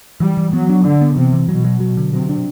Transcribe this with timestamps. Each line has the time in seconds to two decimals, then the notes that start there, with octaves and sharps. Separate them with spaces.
0.20 E3 G3
0.37 E3
0.53 F#3 B3
0.69 D4
0.85 D3 D4
1.01 B3
1.16 C3 E3
1.33 E3
1.49 B2 F#3
1.65 F#3
1.80 F#3
1.97 D3
2.13 C3 F#3
2.29 D4